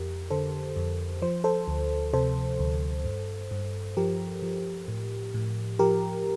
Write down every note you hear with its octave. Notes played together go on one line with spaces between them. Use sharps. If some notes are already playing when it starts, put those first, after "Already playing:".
Already playing: F2 G4 A#4
D3 A4 C5
F2
F3 C5
A4 C5
D2
C3 A4 C5
D2
G2
G2
F3 G4 A#4
F3
A2
A2
F3 G4 A#4